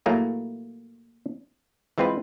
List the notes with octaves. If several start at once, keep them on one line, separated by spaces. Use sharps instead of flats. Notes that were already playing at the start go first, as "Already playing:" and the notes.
A#2 F#3 A3 A#3 E4 G#4
E3 G#3 C4 F4 B4